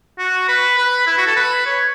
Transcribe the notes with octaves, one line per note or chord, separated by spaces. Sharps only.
F#4
B4
B4
E4
F#4
A4
B4
C#5